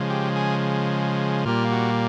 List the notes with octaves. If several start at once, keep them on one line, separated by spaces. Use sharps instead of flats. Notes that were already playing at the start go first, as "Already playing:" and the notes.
Already playing: C#3 F3 G#3
G4
G#4
A#2 G3 A#3 F4
F#4